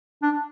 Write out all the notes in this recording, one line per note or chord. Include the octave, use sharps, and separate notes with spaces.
D4